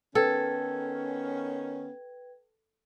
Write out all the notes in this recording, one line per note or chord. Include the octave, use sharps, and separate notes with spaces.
D#3 B3 C#4 A4 B4 G5 G#6